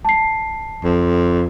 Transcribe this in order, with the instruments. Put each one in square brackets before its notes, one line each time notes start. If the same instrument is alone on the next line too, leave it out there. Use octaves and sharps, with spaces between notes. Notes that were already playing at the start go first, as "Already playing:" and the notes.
[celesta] A5 C7
[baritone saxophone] F2